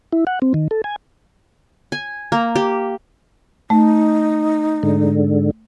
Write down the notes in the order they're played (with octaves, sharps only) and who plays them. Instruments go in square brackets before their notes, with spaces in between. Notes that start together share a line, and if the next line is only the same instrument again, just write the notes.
[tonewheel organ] E4
F#5
C4
D#3
A4
G#5
[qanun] G#5
A#3
G4
[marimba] A3 [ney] D#4
[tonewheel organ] G#2 D3